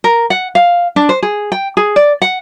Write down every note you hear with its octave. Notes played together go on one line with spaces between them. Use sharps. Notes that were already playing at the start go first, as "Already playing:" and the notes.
A#4
F#5
F5
D4
C5
G#4
G5
G#4
D5
F#5